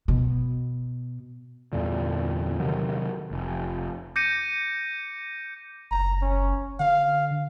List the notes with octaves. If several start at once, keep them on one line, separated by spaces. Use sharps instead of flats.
B2
E2 G2 A#2 D3
C3 D#3 F#3
F1
D6 G6 A#6 C#7 D#7
F#1 A#5
C#4
D3 F5